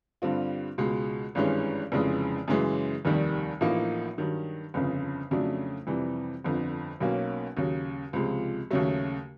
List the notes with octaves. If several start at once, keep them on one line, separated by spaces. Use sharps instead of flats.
G2 D3 G3 C4 F4
C#2 B2 G#3
G#1 G2 E3 G#3 C#4
F1 F2 C#3 E3 G#3
F#2 C#3 E3 G#3
F1 D#2 D#3 G3
A1 A2 F3 A#3 D#4
G2 D#3 F#3
G1 F2 C#3
F2 C#3 F#3 A3 D4
F2 C3 E3 G3
G1 F2 D3
B1 B2 F#3 A#3 C#4
D#2 C#3 F#3
C#2 C3 F3 G#3
D#2 C#3 F#3 A3